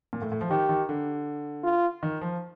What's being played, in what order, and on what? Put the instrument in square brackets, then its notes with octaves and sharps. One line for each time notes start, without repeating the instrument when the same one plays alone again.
[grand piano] A#2
A2
A2
F3
[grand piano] D#3 [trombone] G4
[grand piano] D#3
D3
[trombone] F4
[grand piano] D#3
F3